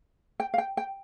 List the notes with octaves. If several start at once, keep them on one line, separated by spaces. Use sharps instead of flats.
G5
F5
G5
G5